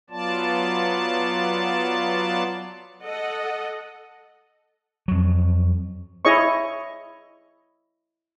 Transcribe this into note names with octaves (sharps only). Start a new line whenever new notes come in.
F#3 B3 F4 D5 A5
A4 D#5 F#5
F2 F#3
E4 G#4 C#5 D#5 C#6